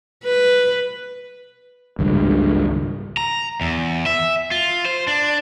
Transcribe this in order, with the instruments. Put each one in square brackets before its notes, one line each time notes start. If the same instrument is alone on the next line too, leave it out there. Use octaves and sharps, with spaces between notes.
[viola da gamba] B4
[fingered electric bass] G#1 C#2 G2
[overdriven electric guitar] A#5
E2
E5
F4
C5
D4